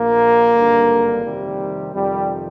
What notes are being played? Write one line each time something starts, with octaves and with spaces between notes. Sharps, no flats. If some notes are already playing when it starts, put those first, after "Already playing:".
Already playing: A#1 A#2 A#3
G#1 G2 D3
F2 C3 D#3 G3
F2 C3 D#3 G3